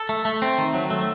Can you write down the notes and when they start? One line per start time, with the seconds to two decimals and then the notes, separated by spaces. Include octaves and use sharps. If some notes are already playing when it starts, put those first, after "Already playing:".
Already playing: A4
0.09 A3
0.25 A3
0.42 C4
0.58 D#3
0.74 F#3
0.90 A3